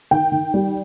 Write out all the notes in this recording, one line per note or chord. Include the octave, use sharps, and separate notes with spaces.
D#3 G5
D#3
G3